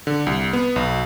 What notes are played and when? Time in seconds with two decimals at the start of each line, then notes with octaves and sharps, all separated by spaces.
0.07 D3
0.27 C2
0.53 B3
0.76 B1